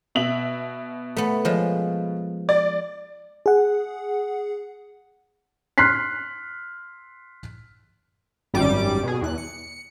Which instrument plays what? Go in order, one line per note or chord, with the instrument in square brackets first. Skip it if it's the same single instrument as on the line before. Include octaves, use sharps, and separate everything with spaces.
[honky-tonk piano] B2 E5 F#7
[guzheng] A3 B3
F3 G#3
[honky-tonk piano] D5
[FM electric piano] G#4 F#5
[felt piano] C6 F6 F#6 B6 C7
[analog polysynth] G#1 F#2 G3 D6 D7
B2 G#4
E2 F#6
C#7